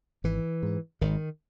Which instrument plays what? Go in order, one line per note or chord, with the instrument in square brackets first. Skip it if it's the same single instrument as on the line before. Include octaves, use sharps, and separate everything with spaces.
[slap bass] G#1 E3
G#2
G#1 D#3